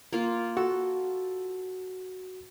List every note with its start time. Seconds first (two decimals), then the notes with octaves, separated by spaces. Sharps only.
0.13 A#3 F4
0.57 F#4 A4